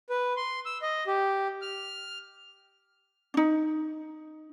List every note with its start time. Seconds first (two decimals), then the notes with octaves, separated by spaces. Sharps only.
0.10 B4
0.37 C6
0.66 E6
0.82 D#5
1.07 G4
1.62 F6
3.34 D4 D#4